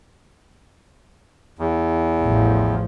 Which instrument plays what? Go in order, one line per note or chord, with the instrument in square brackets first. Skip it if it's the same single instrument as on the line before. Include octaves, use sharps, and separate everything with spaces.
[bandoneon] E2
[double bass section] A1 F3